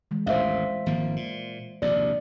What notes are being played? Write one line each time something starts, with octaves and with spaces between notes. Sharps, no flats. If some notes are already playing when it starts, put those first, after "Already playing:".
E3 G#3
A1 D#2 A2 C5 E5 F5
G#1 F3 A#3
A#2
A#1 D#2 C3 D5